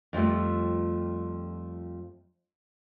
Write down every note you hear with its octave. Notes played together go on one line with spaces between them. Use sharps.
F2 F3 G3 A3